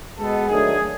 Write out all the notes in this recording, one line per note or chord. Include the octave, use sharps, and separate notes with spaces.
B2 G#3 B3 A4
D#3 F#3 A3 D4 G#4